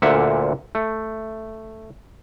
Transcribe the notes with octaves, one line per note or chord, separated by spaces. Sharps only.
D2 A#2 D3 E5 F#5
A3